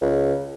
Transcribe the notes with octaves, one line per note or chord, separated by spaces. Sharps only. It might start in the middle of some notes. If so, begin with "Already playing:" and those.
C#2